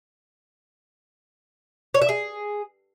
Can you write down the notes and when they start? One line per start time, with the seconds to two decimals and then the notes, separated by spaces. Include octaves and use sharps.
1.94 C#5
2.02 E5
2.09 G#4